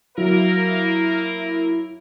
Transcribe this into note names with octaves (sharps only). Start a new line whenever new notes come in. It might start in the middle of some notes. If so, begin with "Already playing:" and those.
F#3 A#3 E4 A#4